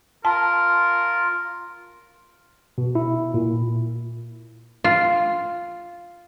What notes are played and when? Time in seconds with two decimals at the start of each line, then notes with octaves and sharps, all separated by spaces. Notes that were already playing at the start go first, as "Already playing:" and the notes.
0.25 F4 A#4 A5
2.78 B2
2.95 E4
3.34 A#2
4.84 F4